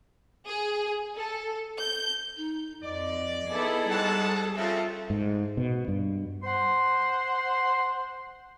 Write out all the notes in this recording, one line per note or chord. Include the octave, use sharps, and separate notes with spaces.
G#4
A4
G6
D#4
F2 D5 D#5
B3 D#4 E4 G#4 A4
G#2 G3 F#5 A5
C#3 F3 C4 F4 A4 E5
G#2
B2
G2
C5 F#5 C6